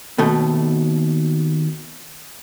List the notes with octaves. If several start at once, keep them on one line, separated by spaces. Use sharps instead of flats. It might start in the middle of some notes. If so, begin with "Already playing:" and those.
D#2 B2 A3